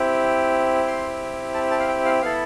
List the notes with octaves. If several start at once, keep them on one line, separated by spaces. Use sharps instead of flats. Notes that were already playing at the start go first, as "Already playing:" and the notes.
Already playing: C4 E4 G4
C6
A5
A5
F5
G5
F5
B3 E4 A4 F5